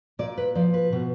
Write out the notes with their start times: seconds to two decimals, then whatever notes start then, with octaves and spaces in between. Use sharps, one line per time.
0.19 A#2 D5
0.38 B4
0.55 F3 D5
0.74 B4
0.92 B2